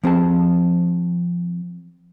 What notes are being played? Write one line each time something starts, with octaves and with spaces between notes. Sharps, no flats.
F3 C4 G#4 A5